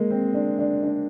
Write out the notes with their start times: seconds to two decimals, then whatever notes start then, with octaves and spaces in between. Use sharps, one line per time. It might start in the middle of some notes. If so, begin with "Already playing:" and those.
Already playing: G#3 A#3
0.10 C4
0.34 D4
0.59 D4
0.83 D4